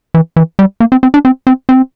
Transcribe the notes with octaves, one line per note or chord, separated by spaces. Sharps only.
E3
E3
G3
A#3
C4
C4
D4
C4
C4
C4